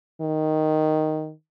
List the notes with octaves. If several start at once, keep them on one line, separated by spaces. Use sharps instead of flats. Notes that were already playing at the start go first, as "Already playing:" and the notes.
D#3